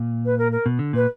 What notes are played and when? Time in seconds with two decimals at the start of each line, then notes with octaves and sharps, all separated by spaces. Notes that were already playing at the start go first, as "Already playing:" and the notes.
Already playing: A#2
0.25 B4
0.38 A#4
0.52 A#4
0.66 B2
0.79 D3
0.93 A#2 B4